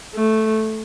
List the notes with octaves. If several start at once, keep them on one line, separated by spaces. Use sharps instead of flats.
A3